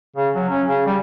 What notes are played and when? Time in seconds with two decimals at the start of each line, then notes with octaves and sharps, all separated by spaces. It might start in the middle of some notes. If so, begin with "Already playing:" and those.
0.16 C#3
0.35 F#3
0.49 C#4
0.67 C#3
0.86 G3